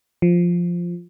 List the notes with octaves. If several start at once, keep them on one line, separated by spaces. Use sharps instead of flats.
F3